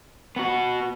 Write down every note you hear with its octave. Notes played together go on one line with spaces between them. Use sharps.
B3 F#4